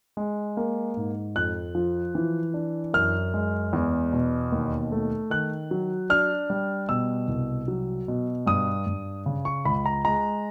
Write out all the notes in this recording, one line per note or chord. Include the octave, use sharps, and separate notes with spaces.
G#3
A#3
G#2
F2 F#6
F3
E3
D4
F#2 F6
G#3
E2
B2
D#2
A3
D#3 F#6
F#3
D4 F6
G3
B2 E6
C2
F#3
B2
G2 D#6
G2
C#3
C#6
C#2 B5
A#5
G#3 A#5